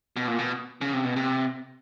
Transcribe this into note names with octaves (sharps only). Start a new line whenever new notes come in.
B2
A#2
B2
C#3
C3
B2
C3